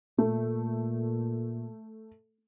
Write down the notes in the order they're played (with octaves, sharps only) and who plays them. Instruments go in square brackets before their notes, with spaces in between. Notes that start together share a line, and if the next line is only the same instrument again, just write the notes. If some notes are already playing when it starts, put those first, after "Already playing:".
[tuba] A#2 [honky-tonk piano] A3